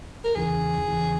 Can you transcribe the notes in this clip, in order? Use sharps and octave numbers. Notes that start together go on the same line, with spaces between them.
A#4
E2 C#3 E3 G#4
E2 C#3 E3